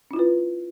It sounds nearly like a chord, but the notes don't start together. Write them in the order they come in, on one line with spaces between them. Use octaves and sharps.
C#4 E4 F4 B4